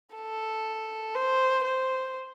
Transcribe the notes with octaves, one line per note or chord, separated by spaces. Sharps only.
A4
C5
C5